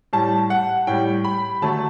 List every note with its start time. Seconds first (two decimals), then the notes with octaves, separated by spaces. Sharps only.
0.13 A2 G3 A5
0.50 F#5
0.87 A2 G3 G5
1.25 B5
1.62 D3 F#3 A3 A5